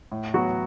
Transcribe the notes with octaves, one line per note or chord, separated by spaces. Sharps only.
A2
F#3 B3 F#4